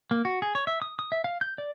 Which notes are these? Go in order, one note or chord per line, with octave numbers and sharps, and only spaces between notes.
A#3
F#4
G#4
C#5
E5
D#6
D#6
E5
F5
G6
D5